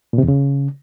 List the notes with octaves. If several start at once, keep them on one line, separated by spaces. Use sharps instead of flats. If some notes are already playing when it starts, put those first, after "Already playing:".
A#2
C3
E2
C#3